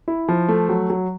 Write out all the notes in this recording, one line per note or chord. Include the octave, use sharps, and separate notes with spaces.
E4
F3
A3
F#3
F#3